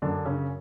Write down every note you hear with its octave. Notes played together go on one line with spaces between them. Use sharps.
F#2 D3 D4
C#3 C#4